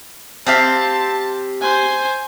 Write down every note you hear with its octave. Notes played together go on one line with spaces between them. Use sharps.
C4 G4 F5 A5
C5 G#5